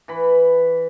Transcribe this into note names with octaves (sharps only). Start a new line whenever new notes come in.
E3 B5